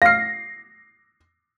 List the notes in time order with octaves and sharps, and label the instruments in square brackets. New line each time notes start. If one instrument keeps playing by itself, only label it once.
[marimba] F5 F6 [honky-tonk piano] A#6 C7